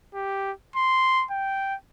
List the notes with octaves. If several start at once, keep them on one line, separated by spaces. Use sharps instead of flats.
G4
C6
G5